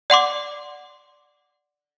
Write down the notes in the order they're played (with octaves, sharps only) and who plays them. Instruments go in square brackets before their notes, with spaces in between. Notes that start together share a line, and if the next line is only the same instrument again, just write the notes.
[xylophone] D5 F#5 C6 D6